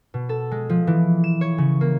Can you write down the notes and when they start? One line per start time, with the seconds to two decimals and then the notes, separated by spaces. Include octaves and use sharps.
0.14 B2
0.29 A4
0.51 G#3
0.70 F3
0.87 E3
1.24 E7
1.41 C#5
1.58 C#3
1.81 A#3